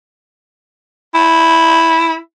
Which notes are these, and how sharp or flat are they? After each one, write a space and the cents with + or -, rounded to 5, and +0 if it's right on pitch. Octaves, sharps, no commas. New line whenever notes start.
E4 -5